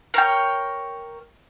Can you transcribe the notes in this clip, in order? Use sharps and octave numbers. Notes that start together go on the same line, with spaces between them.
A#4 C#5 G5